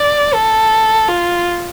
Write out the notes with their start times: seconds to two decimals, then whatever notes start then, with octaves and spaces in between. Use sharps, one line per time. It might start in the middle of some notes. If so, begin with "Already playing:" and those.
Already playing: D5
0.34 A4
1.08 F4